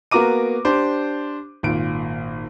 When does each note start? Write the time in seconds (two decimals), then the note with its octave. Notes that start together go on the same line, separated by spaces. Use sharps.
0.11 A#3 B3 F#4 A#5 D6 D#7
0.65 D4 G4 C5
1.63 G#1 A#2 D7